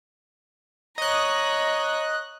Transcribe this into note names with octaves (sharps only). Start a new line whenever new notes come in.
C#5 D#5 A#5 F#6